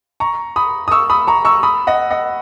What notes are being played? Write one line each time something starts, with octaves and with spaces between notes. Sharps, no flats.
A#5 C#6
B5 D#6
D#6
C#6 E6
B5 D#6
A#5 C#6
C#6 E6
B5 D#6
D#5 F#5
D#5 F#5